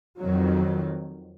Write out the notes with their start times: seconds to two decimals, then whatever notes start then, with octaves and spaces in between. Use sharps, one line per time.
0.19 F2 D#3 F#3